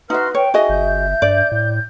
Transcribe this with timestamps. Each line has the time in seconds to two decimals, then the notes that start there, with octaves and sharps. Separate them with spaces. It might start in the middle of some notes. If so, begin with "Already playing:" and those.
0.10 D#4 F#4 B4 E5 C6 F6
0.34 C#5 G5
0.54 D#4 F#4 G#4 D#5 E5
0.69 G1 G6
1.22 G2 D5
1.52 A2